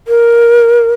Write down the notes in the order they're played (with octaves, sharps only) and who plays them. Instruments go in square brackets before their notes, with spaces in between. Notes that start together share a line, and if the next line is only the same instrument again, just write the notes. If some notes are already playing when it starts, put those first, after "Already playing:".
[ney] A#4